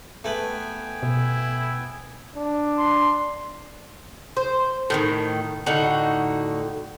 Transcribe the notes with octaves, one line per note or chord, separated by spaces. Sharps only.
A3 B3 B4 G5 G#5
B2 E4
D4
C6
C5
A2 D3 D#3
A2 D3 D#4 F#4